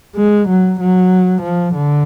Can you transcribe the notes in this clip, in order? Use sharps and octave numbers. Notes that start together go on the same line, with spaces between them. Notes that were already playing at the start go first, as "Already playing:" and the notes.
G#3
F#3
F#3
F3
D3